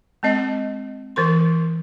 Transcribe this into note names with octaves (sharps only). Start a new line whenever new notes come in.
G#3 C4 D#5
E3 A#4 C6